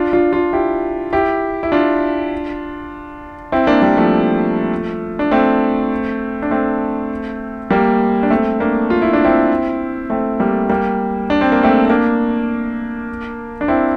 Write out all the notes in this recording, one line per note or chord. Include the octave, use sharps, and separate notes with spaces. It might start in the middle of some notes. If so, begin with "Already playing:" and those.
Already playing: D4 F4
D4 F4
D4 F4
E4 G4
E4 G4
E4
D4 F4
C4 E4
A#3 D4
G3 A#3
F3 A3
D4
A3 C4
D4
A3 C4
G3 A#3
D4
A3 C4
A#3 D4
F4
E4
D4
C4 E4
A3 C4
G3 A#3
G3 A#3
D4
C4
A#3
A3 C4
C4
A#3 D4
D4
C4 E4